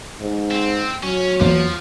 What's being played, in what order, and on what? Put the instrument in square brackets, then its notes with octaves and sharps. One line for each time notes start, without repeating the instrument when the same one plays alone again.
[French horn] G#2
[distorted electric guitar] C4
[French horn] F#3 [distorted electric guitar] C#4
[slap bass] E2 A#3 [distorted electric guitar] F3